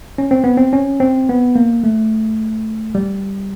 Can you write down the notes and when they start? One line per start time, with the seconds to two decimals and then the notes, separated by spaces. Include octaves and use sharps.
0.18 C#4
0.31 C4
0.44 B3
0.57 C4
0.73 C#4
1.00 C4
1.29 B3
1.55 A#3
1.84 A3
2.95 G3